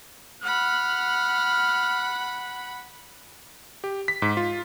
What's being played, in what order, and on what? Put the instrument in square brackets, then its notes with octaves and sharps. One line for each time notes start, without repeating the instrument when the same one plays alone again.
[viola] F#5 B5 [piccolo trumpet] F6
[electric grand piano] G4
B6
G#2
F4